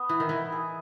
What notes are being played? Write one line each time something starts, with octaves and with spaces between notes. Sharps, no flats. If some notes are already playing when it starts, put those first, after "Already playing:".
Already playing: B3
E3 E4
D#3
E3 E4
G#4